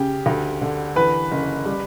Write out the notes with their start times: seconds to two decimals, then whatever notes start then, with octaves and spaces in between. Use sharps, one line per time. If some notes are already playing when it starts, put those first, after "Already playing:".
Already playing: C#3 G4
0.26 D2
0.61 D3
0.96 E3 B4
1.31 F#1
1.66 G3